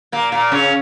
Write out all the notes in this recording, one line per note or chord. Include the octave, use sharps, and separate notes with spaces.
A#2 A#3
A#2 A#3
C#3 C#4